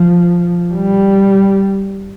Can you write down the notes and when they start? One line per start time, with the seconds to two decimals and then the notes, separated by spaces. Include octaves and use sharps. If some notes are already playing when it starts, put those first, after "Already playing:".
Already playing: F3
0.74 G3